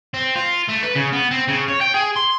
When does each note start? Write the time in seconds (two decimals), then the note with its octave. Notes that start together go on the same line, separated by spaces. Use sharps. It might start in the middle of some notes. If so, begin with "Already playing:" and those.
0.14 C4
0.36 F4
0.68 A3
0.83 B4
0.95 C#3
1.13 B3
1.31 C4
1.48 C#3
1.68 C#5
1.81 G5
1.94 G#4
2.16 C6